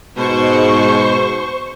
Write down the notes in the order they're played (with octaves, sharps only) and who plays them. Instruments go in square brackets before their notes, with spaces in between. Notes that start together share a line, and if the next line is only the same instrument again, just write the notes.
[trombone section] G#2 [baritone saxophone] B2 [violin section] C5 C#6